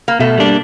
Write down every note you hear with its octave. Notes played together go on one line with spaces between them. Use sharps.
A#3
B2 A3
G3 A#3 D4